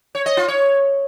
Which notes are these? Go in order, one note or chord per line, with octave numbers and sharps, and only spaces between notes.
C#5
D#5
F4
C#5